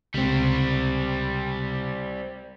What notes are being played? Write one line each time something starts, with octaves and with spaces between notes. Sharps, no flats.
C#2 C3 G3 C4